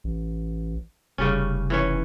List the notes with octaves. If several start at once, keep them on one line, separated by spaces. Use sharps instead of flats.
A1
F1 C#3 G3 C#4
E3 C#4 C#5